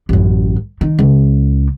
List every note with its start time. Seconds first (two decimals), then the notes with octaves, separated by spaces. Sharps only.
0.09 A1 F#2
0.81 D#3
0.99 C#2